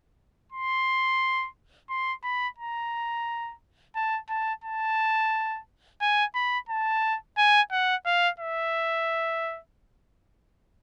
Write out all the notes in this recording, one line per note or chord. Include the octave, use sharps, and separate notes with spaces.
C6
C6
B5
A#5
A5
A5
A5
G#5
B5
A5
G#5
F#5
F5
E5